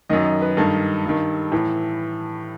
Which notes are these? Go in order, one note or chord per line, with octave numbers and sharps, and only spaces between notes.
F#2 D#3 D#5
D#5
B4
G2 D#3 A4
G2 D#3
A2 E3